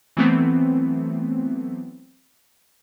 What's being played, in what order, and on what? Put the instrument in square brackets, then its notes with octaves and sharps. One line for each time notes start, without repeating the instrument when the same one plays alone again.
[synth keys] E3 F#3 A3 B3 C4